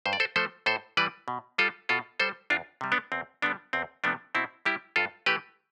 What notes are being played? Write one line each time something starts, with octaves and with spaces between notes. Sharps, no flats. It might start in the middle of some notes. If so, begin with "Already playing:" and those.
G2 C5
D5
A4 C5
F3 A3 A4 C5
A2 A4 C5
E3 G3 B4 D5
B2
G3 F4 A4
B2 F4 A4
G3 A4 C5
E2 D4 F4
C3 G3
B3 D4
E2 C4
D3 G3 B3 D4
E2 C4
C3 F3 A3 B3 D4
B2 C4 E4
G3 E4 G4
G2 F4 A4
E3 A3 G4 B4